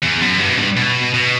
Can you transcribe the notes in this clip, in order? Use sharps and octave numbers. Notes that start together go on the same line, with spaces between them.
E2
F#2
G2
B2
G2
B2
B2